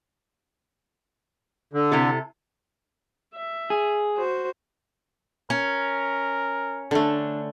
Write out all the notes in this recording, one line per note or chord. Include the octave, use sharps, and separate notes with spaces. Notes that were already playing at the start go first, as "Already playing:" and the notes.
D3
C3 E4 A4
E5
G#4
F#4 C5
C#4 A#4
D3 A3 D4